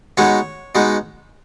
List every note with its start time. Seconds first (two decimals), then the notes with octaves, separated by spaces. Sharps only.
0.17 B2 G#3 B3 D#4 C#5
0.75 B2 G#3 B3 D#4